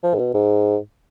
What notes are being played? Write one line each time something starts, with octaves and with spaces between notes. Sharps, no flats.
F3
G#2
B2
G#2